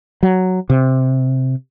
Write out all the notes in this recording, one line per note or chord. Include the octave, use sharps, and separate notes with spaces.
F#3
C3